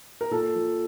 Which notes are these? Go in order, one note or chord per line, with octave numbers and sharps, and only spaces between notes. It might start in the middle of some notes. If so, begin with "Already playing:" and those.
A#4
A#2 A4
F3